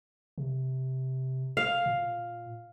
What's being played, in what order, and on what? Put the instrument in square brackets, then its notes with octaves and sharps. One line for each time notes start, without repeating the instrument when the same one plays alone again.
[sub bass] C3
[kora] F5
[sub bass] A#2